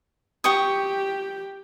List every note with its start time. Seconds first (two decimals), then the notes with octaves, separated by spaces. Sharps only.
0.44 G4 G5 C#6 D#6